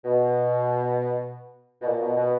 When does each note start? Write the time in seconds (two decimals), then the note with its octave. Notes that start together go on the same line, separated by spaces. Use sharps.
0.05 B2
1.82 B2
1.86 A#2
2.01 B2
2.17 B2